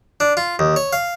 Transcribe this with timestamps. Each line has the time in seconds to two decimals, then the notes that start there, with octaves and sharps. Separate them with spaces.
0.20 D4
0.37 F4
0.59 D#2
0.76 C#5
0.93 F5